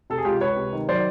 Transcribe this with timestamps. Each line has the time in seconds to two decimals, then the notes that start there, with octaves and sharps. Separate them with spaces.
0.10 C3 A4
0.18 G#4
0.25 C#2 F4 G4
0.41 C#2 B4 C#5
0.56 C3
0.73 D#3
0.88 F#3 C5 D5